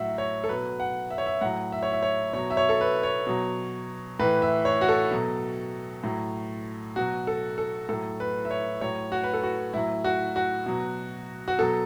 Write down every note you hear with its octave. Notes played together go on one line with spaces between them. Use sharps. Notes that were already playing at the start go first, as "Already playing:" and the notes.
Already playing: A2 F#3 E5 F#5
C#5
A4
B2 F#3 B4
F#5
E5
C#5
E5
A2 F#3 F#5
E5
C#5
E5
C#5
B2 F#3 C#5
E5
C#5
A4
B4
C#5
B2 F#3
A2 E3 B4
E5
C#5
F#4
A4
B2 F#3
A2 F#3
B2 F#3 F#4
A4
A4
A2 F#3 A4
B4
E5
C#5
A2 F#3 C#5
F#4
B4
A4
F#4
A2 F#3 E4
F#4
F#4
B2 F#3
F#4
B2 F#3 A4